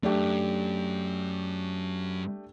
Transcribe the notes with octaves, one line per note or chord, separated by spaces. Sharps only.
F#2 A3 D4 G4